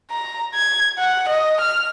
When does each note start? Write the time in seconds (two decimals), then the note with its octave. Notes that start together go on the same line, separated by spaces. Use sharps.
0.11 A#5
0.55 G#6
0.98 F#5
1.29 D#5
1.61 F6